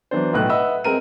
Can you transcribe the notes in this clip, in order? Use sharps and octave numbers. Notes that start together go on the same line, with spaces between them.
E3 F#3 B3 D4 C5
D1 B1 A2 F#6
B4 D#5 E5 F#5 E6
G#3 C4 A#4 D#7